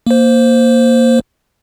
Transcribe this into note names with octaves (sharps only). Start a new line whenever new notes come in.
A#3 C5